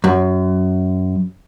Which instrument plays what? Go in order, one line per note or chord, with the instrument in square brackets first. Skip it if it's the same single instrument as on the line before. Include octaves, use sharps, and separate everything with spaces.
[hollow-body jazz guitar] F#2